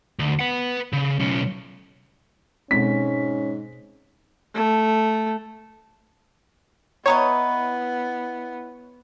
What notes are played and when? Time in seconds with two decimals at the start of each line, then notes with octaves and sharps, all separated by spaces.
0.19 D2
0.39 B4 F#5
0.93 C#3
1.19 B1 C#4
2.71 G#2 B2 G#3 C4 C#4 B6
4.55 A3
7.06 B3 E4 B4 C#5 D#5 G5 A#5 D#6